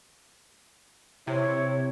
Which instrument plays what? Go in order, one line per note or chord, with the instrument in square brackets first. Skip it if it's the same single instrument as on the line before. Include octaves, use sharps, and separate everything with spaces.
[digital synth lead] C3 [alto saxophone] E4 [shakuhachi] C#5